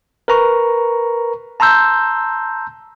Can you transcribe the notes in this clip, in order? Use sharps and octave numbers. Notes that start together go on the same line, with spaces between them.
A#4 B4 A#5 C#6
A5 A#5 C6 E6 G6